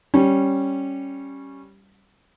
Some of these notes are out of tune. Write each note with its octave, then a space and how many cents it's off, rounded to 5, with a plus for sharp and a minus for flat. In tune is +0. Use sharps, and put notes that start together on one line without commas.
G3 -5 C#4 -10